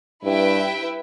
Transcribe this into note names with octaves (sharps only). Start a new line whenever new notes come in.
G2 E4 B4 E5 G5